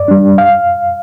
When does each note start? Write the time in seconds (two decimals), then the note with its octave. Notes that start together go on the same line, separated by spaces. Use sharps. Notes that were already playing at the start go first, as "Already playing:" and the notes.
Already playing: G2 D5
0.08 G3 D4
0.38 F5